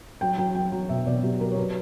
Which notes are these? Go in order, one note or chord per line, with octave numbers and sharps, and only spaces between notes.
F#3 G5
F#3 G5
F#3 G5
F#3
B2 E5
B2 D5
F#3 G4
F#3 A#4
C#5
F#3 B4